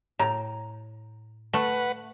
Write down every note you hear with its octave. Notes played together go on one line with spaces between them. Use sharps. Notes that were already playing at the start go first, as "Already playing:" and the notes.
A2 A#5
A3 B4 F#5